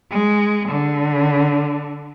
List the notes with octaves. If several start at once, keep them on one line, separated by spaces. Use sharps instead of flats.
G#3
D3